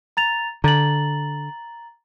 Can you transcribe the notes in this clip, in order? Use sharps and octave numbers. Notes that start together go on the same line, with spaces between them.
A#5 A6 F7
D3 A#5 A6 F#7